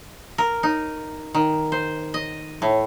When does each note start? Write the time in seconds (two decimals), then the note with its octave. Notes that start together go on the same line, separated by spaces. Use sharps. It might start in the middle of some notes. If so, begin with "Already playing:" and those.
0.38 A#4
0.63 D#4
1.34 D#3
1.72 C5
2.14 D#5
2.62 A2